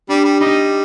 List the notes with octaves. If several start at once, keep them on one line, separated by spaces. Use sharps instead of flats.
G3 D4
G3
G3 D#4